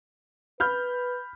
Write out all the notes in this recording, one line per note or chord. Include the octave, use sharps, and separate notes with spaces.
B4 B5 F6 G6